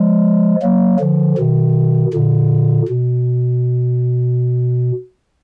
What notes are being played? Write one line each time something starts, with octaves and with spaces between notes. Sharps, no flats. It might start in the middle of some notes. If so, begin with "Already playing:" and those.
Already playing: F3 G#3
F#3 A#3
D3 F3
B2 D#3
A#2 D3
B2